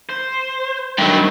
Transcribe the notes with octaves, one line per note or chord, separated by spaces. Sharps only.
C5
G2 D#3 F#3 A3